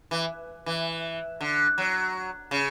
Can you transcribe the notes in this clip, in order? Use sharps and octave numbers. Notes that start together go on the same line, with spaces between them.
E3
E3
D3
F#3
C#3